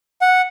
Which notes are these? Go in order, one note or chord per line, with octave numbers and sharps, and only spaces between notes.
F#5